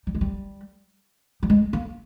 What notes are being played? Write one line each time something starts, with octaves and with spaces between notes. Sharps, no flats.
G3
G#3
G3
G3
G#3
A#3